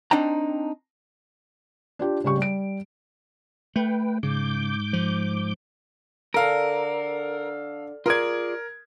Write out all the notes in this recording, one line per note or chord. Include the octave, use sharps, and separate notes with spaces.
C4 D4 D#4 G5 A#5
D4 F4 G4
C#3 G3 G4 C#6
G3 D7
A3 B4 G5
G#2 C#3 D6 G6
F3
D3 A4 A#4 F5
F4 G#4 A#4 D5 G#6